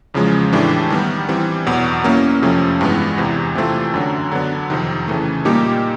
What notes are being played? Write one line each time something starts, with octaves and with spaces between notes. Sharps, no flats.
E2 C#3 F3 G#3
A2 E3 A3 D4 G4
D#3 G3 B3
E3 G3 C4
E2 B2 F#3 B3
F#3 A#3 C#4 E4
F2 C3 F3 A3 C#4
G2 E3 G#3 B3
E2 C3 E3
C3 E3 A3 C4 F4
F#2 D3 F#3
D3 F#3 B3 D4
F2 C3 D#3
C#3 E3 A3
A#2 G3 A#3 D#4 G4